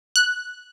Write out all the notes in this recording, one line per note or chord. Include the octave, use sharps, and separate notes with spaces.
F#6